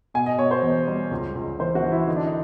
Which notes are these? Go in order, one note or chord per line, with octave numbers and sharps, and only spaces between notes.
B2 G#5
D#5
B2 C#5
C5
E2
G3
C#2
C#2
E3 C5
F#4
E3
E4
D3 D#4
D4
D#4